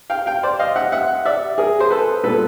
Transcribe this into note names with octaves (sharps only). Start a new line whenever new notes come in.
F5 G5
F5 G5
C5 D5
D#5 F5
E5 F#5
E5 F#5
D5 E5
G#4 A#4
C5
A4 B4
A#2 G3 B3 A4 B4